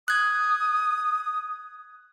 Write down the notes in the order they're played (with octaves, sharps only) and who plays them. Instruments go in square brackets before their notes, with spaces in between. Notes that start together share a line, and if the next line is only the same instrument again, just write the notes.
[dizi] D#6 [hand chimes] F#6 G#6